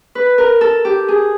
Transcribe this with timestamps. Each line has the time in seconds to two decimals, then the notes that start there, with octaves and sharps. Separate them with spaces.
0.15 B4
0.38 A#4
0.61 A4
0.85 G4
1.08 G#4